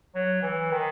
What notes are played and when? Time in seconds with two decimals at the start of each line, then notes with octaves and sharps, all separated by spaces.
0.15 F#3
0.42 E3
0.71 D#3